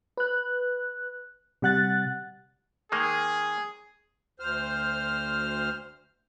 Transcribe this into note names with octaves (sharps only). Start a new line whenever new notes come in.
B4 F#6
C3 G3 F#5 F#6 A6
D#3 G#3 A#3 G#4
D2 C5 F6